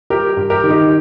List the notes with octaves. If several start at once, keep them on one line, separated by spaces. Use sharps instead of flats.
G3 G4 A#4
G2
G4 A#4
D#3
D#4 G4